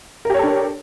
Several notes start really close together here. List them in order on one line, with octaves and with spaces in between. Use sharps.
A#4 G4 C#5 A4 D4